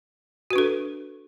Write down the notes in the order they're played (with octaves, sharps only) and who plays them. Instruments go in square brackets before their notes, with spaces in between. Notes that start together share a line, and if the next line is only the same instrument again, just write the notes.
[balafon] F#4
B4
D4
A4